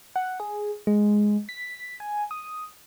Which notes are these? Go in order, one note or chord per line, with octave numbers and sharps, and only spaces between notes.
F#5
G#4
G#3
B6
G#5
D#6